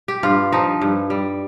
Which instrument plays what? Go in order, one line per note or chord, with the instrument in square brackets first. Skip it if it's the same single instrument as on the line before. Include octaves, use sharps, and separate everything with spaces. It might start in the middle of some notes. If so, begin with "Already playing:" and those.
[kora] G4
G2 F4
F3 D#4
G2
G3